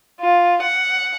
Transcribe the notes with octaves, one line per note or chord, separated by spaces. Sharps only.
F4
F#5